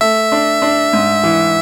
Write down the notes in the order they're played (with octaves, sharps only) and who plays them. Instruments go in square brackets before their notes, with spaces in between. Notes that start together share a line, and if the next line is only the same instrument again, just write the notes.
[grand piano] A3 [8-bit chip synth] E5
[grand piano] D4
D4
G#2
E3